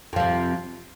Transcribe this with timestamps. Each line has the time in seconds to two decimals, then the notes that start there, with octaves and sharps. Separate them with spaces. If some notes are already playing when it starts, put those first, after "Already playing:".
0.13 F2
0.16 F3
0.20 C3